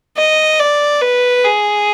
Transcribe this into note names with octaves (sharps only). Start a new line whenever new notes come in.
D#5
D5
B4
G#4